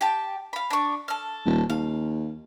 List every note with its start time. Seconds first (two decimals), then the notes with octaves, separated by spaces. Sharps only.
0.01 G4 G5 A5
0.53 F5 B5
0.70 D4 C#6
1.08 A4 F6
1.46 D#1
1.70 D#2 F5